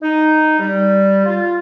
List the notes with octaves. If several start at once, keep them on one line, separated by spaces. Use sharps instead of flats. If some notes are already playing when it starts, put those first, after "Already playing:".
D#4
G3
F4